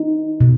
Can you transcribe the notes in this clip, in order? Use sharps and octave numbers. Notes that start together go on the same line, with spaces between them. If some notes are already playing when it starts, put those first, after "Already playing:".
Already playing: D#4
B2